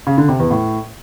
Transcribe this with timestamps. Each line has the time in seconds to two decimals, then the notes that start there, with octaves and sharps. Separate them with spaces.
0.07 C#3
0.18 D3
0.29 C3
0.40 E2
0.51 A2